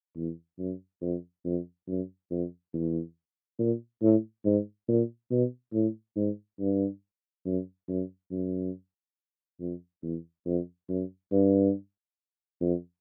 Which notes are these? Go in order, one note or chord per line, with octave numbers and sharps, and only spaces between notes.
E2
F#2
F2
F2
F#2
F2
E2
A#2
A2
G#2
A#2
B2
A2
G#2
G2
F#2
F#2
F#2
F2
E2
F2
F#2
G2
F2